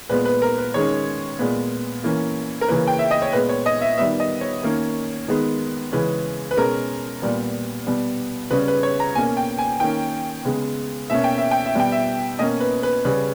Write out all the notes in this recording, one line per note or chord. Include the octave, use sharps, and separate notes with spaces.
A#2 G#3 B3 B4
B4
A#4
B4
D#3 G#3 C#4 C#5
A#2 G#3 B3
E3 A#3 C#4
A#4
C#3 E3 A#3 C#4 B4
G5
E5
D#5
C#5
A#2 G#3 B3 B4
C#5
D#5
E5
D#3 G3 B3 E5
D#5
C#5
D#3 A#3 C#4
D#3 G#3 B3
C#3 E3 G#3 C#4 B4
B4
B2 G#3 C#4 A#4
A#2 G3 B3
B2 G3 B3
C#3 G3 C#4 B4
B4
C#5
A#5
B2 A#3 C#4 G#5
G5
G#5
D#3 A#3 C#4 G5
C#3 G#3 B3
B2 A#3 C#4 E5
G5
E5
G5
E5
B2 G3 B3 G5
E5
B2 A#3 C#4 D#5
B4
B4
C#3 G3 C#4 B4